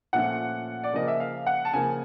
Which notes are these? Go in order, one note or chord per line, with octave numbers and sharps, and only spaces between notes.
A#2 F3 A3 C#4 F#5
D5
C#3 F3 A#3 D#5
E5
F5
F#5
A5
C#3 F3 A#3 G#5